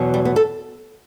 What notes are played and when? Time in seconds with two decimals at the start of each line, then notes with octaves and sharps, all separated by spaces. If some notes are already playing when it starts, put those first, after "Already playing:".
Already playing: E2 B2 F#3
0.14 G3
0.25 B3
0.36 A4